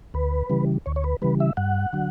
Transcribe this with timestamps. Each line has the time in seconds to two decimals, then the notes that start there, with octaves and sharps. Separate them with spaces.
0.14 D2 B4
0.50 C#3 E3 G3
0.86 D2 C#5
0.96 C#5
1.04 B4
1.22 C#3 E3 G3 B4
1.40 E5
1.57 G2 F#5
1.93 D3 F#3